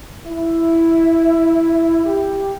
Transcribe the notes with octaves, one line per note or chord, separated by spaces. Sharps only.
E4
G4